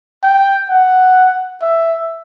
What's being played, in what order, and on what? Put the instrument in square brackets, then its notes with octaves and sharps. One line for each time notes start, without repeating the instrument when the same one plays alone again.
[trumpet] G5
F#5
E5